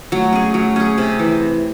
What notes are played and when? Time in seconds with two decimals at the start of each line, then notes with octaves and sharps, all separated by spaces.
0.12 F#3 A3
0.33 C#4 G#4
0.54 F#3
0.76 C#4 G#4
0.98 C3
1.19 E3